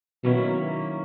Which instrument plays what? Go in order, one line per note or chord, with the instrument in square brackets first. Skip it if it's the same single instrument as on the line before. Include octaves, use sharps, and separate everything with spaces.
[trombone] B2 [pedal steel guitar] D#3 F#3 A#3 C#4 E4